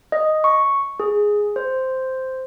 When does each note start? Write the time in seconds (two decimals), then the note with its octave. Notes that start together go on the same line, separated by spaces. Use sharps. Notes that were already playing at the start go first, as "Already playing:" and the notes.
0.12 D#5
0.44 C#6
1.00 G#4
1.56 C5